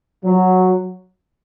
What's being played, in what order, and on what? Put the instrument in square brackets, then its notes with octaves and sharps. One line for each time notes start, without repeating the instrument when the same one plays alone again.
[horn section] F#3